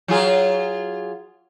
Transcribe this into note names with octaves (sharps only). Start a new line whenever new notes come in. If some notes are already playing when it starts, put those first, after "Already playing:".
F#3 F4 G#4